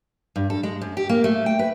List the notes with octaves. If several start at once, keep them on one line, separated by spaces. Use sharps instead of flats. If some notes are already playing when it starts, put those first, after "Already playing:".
G2
A4
G#3
F#2
G4
A#3
A3
G5
B4